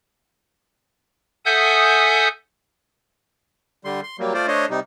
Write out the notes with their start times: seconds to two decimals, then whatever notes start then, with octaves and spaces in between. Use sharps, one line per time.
1.45 A4 E5 F#5 G#5 D#6 G6
3.85 D3 G3 C6
4.03 C6
4.19 F#3 G3 A#3
4.34 A3 F4 C5 D5
4.48 A3 D4 C5 C#5 D#5
4.70 C3 G3 D#4